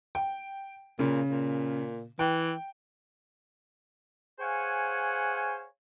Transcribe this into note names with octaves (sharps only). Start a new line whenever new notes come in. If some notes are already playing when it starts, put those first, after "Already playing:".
G5
A#2 C#3
A#2
E3 G5
G#4 C5 C#5 F5 F#5 G#5